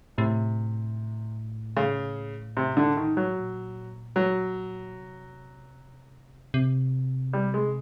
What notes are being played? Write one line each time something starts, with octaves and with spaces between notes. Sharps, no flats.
A2 C3
C#3
C3
D3
D#3
F#3
A#2
F#3
C3
C3
G3
G#3